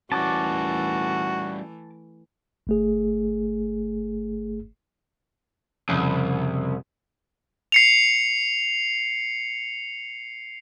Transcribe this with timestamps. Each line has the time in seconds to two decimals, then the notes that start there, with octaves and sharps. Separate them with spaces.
0.12 E3 G3 A3 C#4 F#4 A5 D6
2.67 G1 A3 G#4
5.89 C2 F2 C#3
7.72 C7 C#7 F7